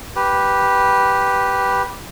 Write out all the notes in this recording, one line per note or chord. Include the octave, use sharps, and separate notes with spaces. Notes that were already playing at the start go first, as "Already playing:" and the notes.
G4 B4